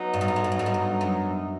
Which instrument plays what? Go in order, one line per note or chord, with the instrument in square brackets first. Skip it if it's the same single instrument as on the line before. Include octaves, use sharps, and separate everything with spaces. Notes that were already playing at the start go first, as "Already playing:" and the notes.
Already playing: [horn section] F#3 B3 D#4
[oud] G2
G#2
G2
G#2
G2
G#2
G2
G#2
G2
F#2